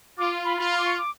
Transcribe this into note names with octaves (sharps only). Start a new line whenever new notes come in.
F4 D6
B5
F4 B5
B5
D6
C#6
D6